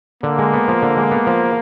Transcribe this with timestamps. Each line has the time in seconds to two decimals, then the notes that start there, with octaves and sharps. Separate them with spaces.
0.23 D3 A#3
0.38 G#3
0.53 B3
0.68 F3
0.82 D3
0.97 G#3
1.11 B3
1.27 F3